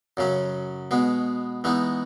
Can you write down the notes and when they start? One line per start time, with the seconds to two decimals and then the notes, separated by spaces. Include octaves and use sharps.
0.17 F#2 C#3 F#3 C#4
0.91 B2 G#3 B3
1.64 E3 G#3 B3 D#4